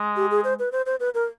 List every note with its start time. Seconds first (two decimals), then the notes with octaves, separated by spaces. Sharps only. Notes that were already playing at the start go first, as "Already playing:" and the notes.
Already playing: G#3
0.16 G4
0.31 G#4
0.44 C5
0.59 B4
0.72 C5
0.86 C5
1.00 B4
1.14 A#4